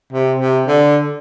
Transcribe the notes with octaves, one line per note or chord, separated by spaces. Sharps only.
C3
C3
D3